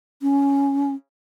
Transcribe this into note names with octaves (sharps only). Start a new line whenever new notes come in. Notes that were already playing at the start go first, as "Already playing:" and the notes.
C#4